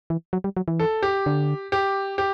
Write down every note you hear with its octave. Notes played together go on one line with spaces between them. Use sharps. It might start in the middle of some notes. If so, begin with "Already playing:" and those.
E3
F#3
G3
F#3
E3
A4
G4
D3
G4
G4